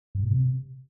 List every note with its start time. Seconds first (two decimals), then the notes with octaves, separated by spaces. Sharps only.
0.15 G2
0.23 A#2
0.31 C3